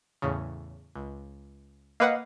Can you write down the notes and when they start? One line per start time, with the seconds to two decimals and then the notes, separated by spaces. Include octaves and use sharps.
0.22 E2 A2 C#3
0.96 C#2
2.00 A#3 B4 D#5 F5 F#5